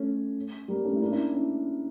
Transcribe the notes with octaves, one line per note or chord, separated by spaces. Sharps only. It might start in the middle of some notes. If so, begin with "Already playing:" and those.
Already playing: A3 C#4
G3 A#3
A3 C#4
E4
A#3 D4
C#4 E4
C#4 E4